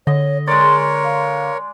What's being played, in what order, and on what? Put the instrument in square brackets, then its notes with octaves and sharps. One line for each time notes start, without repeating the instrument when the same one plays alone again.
[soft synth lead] D3 [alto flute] C#5 [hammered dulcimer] D#5
[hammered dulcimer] G#3 D5 [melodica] A#4 C#5 [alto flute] C6
[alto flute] F5